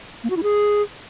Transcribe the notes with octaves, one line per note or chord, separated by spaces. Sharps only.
A#3
F#4
E4
G#4